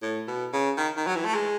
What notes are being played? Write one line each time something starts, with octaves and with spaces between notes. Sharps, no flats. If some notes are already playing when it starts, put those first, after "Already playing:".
A2
B2
C#3
D#3
D#3
F#3
E3
A3
G#3